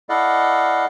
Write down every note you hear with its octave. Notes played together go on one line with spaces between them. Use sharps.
E4 A4 D5 D#5 F5 F#5